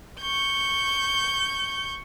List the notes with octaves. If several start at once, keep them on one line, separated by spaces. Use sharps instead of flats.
C#6 G6